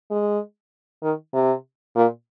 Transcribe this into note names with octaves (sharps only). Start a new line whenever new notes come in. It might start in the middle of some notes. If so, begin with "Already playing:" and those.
G#3
D#3
C3
A#2